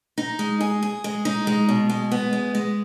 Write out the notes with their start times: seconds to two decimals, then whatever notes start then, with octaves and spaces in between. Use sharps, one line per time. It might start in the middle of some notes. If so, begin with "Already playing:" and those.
0.18 D#4
0.39 G#3
0.61 G#4
0.83 G#4
1.04 G#3
1.25 D#4
1.47 G#3
1.69 B2
1.90 G#3
2.11 B3
2.33 G#3
2.55 G#3